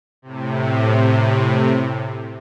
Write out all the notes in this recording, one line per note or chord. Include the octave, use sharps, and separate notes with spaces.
A2 C3